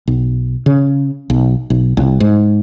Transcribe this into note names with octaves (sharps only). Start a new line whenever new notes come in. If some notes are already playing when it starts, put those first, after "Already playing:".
B1
C#3
B1
B1
C2
G#2